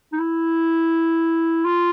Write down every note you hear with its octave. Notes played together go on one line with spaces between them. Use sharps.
D#4
E4
F4